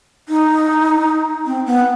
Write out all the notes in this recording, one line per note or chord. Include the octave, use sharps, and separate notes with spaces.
D#4
C4
B3